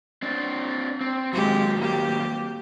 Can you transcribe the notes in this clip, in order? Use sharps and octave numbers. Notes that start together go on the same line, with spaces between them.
C4 D4
C4
D#2 F#3 G#3 G4
A#3 G4